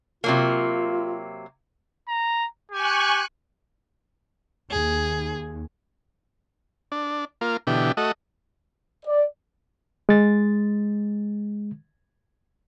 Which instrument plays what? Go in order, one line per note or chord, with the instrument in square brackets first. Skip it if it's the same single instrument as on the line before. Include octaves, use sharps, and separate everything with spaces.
[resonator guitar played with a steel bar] C3 F#3 A#3 [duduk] F4
[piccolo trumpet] A#5
[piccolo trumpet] G4 [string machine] G#5 C#6 F#6
[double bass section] D#2 [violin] G#4
[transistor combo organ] D4
A#3 F4
B2 D3 E3 G4
A3 F#4 D#5
[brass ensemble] D5
[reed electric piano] G#3 A6